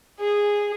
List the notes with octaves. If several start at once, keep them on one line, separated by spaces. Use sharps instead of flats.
G#4